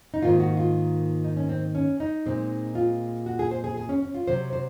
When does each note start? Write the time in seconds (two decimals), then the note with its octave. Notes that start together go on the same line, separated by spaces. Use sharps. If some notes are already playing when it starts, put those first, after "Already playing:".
0.14 D#4
0.22 G#2 D#3 A#3 F4
0.40 F#4
0.57 F4
1.24 D#4
1.37 C#4
1.49 C4
1.75 C#4
2.00 D#4
2.26 A#2 G#3 C4
2.75 F4
3.26 F#4
3.39 G#4
3.51 C5
3.64 G#4
3.77 G#4
3.89 C#4
4.03 C#4
4.14 F4
4.28 C3 F#3 C4 C5
4.53 C5